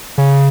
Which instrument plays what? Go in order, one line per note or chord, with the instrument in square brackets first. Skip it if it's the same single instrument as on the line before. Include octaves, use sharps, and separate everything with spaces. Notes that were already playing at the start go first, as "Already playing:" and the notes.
[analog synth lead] C#3